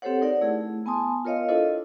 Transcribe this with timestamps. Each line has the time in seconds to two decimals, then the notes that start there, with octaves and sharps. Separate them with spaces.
0.02 C4 G4 A4 C5 C#5 F#5
0.22 D#4 A#4 D5 F#5
0.41 A3 E4 G#4
0.86 B3 G#5 A5 C6 D#6
1.25 F4 A#4 C#5 D#5 F5
1.49 D4 E4 F4 A4 C5 D#5